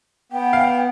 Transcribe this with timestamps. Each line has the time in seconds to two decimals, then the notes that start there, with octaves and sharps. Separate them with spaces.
0.32 B3 G5
0.53 F5